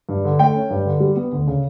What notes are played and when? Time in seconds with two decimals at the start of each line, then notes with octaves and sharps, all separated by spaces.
0.09 G2
0.25 D3
0.39 A3 G5
0.54 C#4
0.70 G2
0.85 D3
1.00 G3
1.16 B3
1.32 D2
1.47 C#3